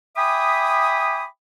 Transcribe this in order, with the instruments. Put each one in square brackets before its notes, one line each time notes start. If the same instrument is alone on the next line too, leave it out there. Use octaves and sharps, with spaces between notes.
[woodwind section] E5 G5 G#5 B5 D6 D#6